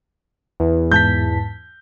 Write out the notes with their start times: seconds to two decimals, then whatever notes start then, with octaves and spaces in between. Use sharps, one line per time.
0.60 E2
0.92 G#2 A5 G6 B6